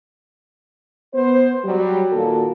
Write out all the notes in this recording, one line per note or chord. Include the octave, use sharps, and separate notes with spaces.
B3 C5
F#3 G3
A#2 D#3 A#3 F#4 A4